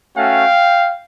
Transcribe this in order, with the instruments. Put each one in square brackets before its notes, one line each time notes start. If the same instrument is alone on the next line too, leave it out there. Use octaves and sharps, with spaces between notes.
[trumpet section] A3 C#4 F#4 F5 G5